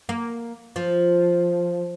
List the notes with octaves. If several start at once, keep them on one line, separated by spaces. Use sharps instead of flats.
A#3
F3